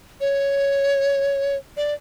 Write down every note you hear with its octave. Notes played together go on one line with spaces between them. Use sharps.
C#5
D5